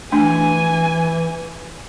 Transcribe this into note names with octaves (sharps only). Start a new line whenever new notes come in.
E3 A3 D4 G#5